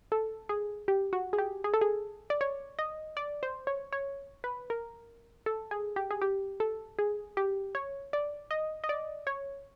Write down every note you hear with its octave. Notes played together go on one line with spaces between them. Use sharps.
A4
G#4
G4
F#4
G#4
G4
G#4
A4
G#4
D5
C#5
D#5
D5
C5
C#5
C#5
B4
A#4
A4
G#4
G4
G#4
G4
A4
G#4
G4
C#5
D5
D#5
D#5
D5
C#5